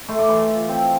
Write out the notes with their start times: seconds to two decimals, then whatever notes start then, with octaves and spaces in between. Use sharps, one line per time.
0.09 A3 C6
0.19 D6
0.29 E3 C6
0.38 A5
0.49 F4
0.69 C4